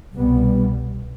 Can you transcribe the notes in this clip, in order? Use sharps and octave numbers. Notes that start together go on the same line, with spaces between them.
C2 B2 G3 B3